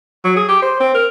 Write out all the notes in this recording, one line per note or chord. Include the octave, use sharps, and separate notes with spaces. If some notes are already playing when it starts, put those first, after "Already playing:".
F#3
G#4
G4
C5
C4
A#4